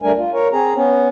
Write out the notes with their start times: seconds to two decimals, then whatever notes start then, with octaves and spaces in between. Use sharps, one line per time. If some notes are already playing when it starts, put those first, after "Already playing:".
0.02 D2 G3 A3 D4 A#4 G#5
0.18 F4
0.33 A#4 C#5
0.52 C4 G#4 A#5
0.75 B3 C#4